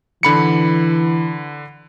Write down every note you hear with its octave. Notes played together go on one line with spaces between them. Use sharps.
D3 E3 B5 C#7